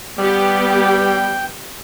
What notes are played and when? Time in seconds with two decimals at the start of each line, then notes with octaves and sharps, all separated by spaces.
0.18 G3 B3 G4
0.70 G5